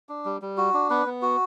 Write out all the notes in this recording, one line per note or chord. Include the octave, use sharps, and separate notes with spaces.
D4
G3
G3
F#4
D4
B3 B4
B3
F#4